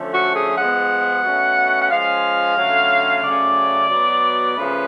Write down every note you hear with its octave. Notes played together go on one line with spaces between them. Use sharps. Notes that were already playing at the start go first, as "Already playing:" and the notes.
Already playing: D3 F3 A3 C#4
F#4
G#4
F3 G#3 B3 F#5
B2 A3 C#4
F#5
F3 G#3 C#4 F5
D3 F#3 A3 C#4
C#3 F#3 A3 C#4 D5
B2 F#3 B3
C#3 F3 A3 C#4 B4